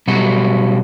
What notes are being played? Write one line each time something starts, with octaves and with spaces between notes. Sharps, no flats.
B2 F#3 G3 F#4